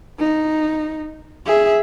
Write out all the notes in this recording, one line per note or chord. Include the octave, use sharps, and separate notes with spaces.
D#4
G#4 E5